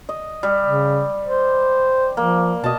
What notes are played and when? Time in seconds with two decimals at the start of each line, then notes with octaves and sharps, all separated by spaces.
0.09 D#5
0.43 G3
0.65 C#3
1.24 C5
2.17 F3 A#3
2.64 B2 D#5 A5